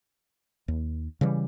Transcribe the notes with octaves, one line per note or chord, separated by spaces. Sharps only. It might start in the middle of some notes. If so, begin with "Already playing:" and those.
D#2
C#3 E3 G3